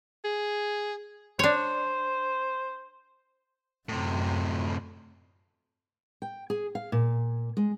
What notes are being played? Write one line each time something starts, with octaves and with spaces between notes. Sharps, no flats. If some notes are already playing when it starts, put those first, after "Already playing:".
G#4
D4 C5 C#5
F#2 A2 C3
G5
G#4
F5
A#2
G#3